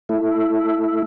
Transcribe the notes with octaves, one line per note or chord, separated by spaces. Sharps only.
A3 E4